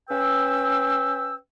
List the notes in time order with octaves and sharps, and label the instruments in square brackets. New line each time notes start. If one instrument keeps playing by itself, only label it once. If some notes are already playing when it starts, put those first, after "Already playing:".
[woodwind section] C#4 B4 G5 E6